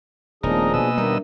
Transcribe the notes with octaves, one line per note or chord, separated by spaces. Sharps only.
D#1 F3 A3 B3 D4 D#4 G#4 A#4
B2 A#3 D#5 G#5 E6
D#2 D#3 G3 D4 A#4 E5 A#5